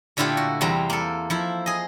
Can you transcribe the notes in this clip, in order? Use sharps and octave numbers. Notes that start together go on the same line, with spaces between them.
A#2 D3 A3 E4 F4 G4
F#4
E2 C3 G3 C4 A#5
A#3 A4
F3 E4
G#4 D#5